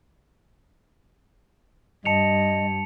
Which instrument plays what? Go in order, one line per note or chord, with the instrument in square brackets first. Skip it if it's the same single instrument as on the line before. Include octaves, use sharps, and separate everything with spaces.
[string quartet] G2 [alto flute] D#5 [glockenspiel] A5 C#7 F7